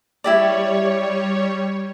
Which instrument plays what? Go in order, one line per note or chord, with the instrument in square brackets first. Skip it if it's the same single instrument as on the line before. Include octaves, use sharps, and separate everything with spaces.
[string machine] G3 C#5 [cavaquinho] E4 G4 D5